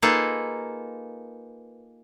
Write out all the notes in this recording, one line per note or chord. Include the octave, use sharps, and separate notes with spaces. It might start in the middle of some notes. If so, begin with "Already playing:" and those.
A#3 D#4 F4 G#4 A4 B4